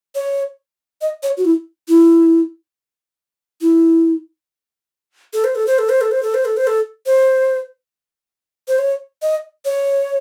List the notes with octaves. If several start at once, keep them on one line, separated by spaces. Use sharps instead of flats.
C#5
D#5
C#5
F#4
E4
E4
E4
A4
C5
A4
C5
A4
C5
A4
C5
A4
C5
A4
C5
A4
C5
C5
C#5
D#5
C#5